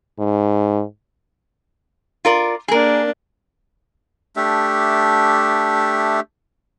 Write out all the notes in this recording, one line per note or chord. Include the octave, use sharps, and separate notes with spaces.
G#2
F4 A#4 D5
A#3 D4 G#4 A#4
A3 D4 G4 E5